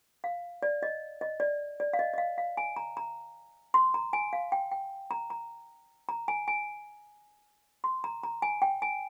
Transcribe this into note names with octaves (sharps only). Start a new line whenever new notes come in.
F5
D5
D#5
D#5
D5
D5
F5
D#5
D#5
F5
F5
G#5
A#5
A#5
C6
A#5
G#5
F5
G5
G5
A#5
A#5
A#5
G#5
G#5
C6
A#5
A#5
G#5
G5
G#5